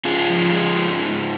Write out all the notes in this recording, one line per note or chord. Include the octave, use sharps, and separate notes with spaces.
G#2 F4 G#4
F3
G#3
G#2
G#2